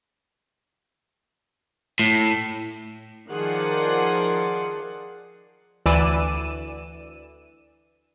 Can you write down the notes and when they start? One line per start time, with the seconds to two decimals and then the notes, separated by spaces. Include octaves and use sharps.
1.99 A2
3.30 D#3 F3 G#4 D5 F#5 C6
5.86 D2 E3 D5 E6 D#7 E7